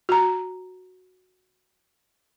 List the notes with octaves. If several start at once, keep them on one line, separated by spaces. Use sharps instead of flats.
F#4 A#5